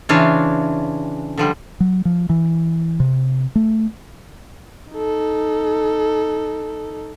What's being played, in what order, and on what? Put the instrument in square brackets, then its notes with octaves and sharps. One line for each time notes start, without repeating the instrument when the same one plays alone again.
[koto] C#3 E3 D4 F4 C#5
D3 F3 G3
[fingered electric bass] F#3
F3
E3
C3
A3
[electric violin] D#4 A4